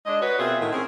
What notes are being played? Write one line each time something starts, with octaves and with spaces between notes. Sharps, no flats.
G#3 D4 D#5
F#4 B4 C#5
B2 C4 F4 G#4 A#4 E5
A2 D#3 B3
C4 C#4 G#4 A#4